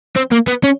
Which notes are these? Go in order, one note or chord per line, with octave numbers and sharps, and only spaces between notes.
C4
A#3
B3
C#4